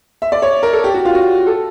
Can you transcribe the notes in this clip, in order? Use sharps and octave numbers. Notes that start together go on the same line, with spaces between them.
E5
D5
C#5
A#4
A4
G4
F#4
F4
F#4
A4